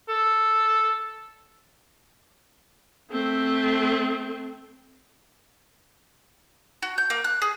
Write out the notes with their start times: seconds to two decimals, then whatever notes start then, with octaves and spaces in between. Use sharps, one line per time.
0.09 A4
3.11 A3 C4
6.82 F#4
6.98 G6
7.10 A#3
7.24 F#6
7.42 G#4